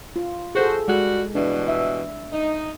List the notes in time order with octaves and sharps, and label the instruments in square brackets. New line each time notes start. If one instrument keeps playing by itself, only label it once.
[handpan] F4
[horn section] F#4 C5 [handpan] G#4 A4
[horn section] G3 F#4 [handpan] G#3
[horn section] G2 B2 E3 [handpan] D4
[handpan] E5
[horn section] D#4